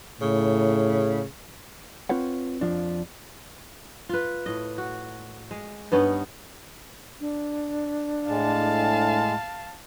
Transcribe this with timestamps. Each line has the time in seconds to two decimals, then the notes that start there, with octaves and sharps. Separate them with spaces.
0.22 A2 C#3
2.09 C4 F4 B4 C#5 F#5
2.61 F2 F3 D4
4.09 F4 B4
4.46 A2 D#5
4.78 F#4
5.51 G#3
5.92 G2 B3 C#4 D#4
7.20 D4
8.28 A2 G#3 F5 A5